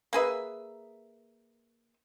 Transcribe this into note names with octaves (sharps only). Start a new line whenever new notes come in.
A#3 G#4 B4 E5